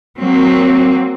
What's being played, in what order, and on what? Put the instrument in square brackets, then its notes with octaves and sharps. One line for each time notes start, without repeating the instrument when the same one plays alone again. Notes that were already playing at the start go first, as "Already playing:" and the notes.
[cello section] F#3 A#3 C4